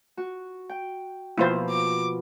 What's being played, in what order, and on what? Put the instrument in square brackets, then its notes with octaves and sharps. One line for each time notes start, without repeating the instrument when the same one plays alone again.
[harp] F#4
G5
[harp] B2 F3 A#3 [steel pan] E4 F4 C5
[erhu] D6